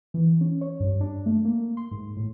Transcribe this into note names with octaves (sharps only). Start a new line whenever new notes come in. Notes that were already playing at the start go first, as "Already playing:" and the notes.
E3
C#4
C#5
G2
D4
A3
A#3
C6
G#2
A2